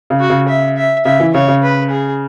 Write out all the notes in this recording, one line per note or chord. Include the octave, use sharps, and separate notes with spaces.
C#3
F#4
C#3
E5
E5
C#3 E5
E3
C#3 C#5
C#3
B4
G#4